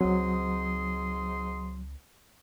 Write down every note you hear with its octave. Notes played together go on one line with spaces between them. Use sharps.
C#2 G#2 F#3 C4 C6 D#6